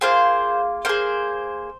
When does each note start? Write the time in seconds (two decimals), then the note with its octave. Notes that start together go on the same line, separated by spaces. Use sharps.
0.01 A#3 F4 G#4 C5
0.85 A#3 G#4 C5